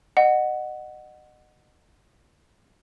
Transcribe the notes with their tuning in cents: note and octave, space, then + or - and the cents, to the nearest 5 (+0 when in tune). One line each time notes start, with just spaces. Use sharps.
D#5 -30 F#5 +0